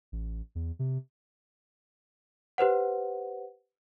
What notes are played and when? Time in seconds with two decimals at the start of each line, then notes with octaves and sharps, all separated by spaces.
0.12 A1
0.55 E2
0.79 C3
2.58 G4 B4 C5 F#5